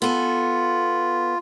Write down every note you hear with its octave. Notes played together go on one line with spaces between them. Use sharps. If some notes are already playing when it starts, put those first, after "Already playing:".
B3 F4 A4 G#5